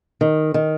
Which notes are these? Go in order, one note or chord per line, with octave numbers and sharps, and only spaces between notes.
D#3
D#3